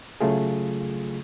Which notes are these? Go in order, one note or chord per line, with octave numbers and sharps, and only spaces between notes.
C#3 F#3 A3 F4 G#4